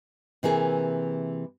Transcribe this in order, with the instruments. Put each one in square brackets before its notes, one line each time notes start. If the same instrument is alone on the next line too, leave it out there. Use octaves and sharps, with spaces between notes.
[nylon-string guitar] C3 E3 A#3 G#4